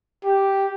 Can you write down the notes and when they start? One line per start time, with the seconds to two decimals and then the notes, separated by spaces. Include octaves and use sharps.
0.25 G4